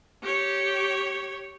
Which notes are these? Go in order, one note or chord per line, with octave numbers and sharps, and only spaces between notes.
G4 C#5